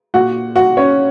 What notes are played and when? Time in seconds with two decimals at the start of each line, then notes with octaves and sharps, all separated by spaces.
0.14 A#2 F#4 F#5
0.55 F#4 F#5
0.77 C#4 C#5